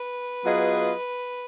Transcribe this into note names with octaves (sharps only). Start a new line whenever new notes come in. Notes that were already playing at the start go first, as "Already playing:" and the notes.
Already playing: B4
F#3 B3 F4 G#4 D#5